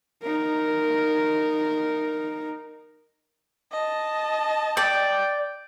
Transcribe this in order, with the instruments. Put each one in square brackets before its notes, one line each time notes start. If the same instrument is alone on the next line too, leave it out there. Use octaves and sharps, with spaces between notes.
[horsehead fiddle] D#4 A#4
[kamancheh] D#5 A5
[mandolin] D5 [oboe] G5